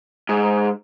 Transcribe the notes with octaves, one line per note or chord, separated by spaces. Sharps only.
G#2